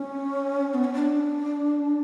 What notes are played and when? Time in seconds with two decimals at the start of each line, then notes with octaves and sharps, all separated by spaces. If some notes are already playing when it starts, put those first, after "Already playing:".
Already playing: C#4
0.74 B3
0.84 C#4
0.94 D4